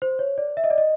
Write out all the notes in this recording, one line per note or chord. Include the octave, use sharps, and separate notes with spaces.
C5
C#5
D5
E5
D#5
D5
D#5